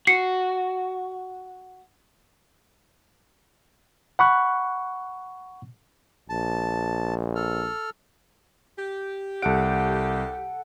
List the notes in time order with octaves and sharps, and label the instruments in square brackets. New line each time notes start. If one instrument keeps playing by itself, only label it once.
[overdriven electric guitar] F#4 [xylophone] C7 C#7
[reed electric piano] F#5 B5 C#6 F#6
[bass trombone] A#1 [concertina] A5
[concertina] A4 F6
[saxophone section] G4
[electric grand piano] C2 D7 [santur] A4 F#5